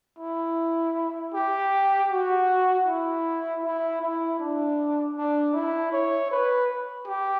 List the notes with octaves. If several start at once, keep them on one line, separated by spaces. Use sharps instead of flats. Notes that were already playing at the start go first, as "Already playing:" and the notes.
E4
G4
F#4
E4
E4
E4
D4
D4
E4
C#5
B4
G4